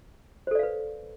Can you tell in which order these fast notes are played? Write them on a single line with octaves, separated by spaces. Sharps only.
C5 A4 D5 F5 B4